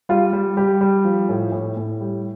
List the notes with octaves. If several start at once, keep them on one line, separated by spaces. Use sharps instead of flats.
G3 F4
G3
G3 G4
G3
F3
A2
A2
A2
G3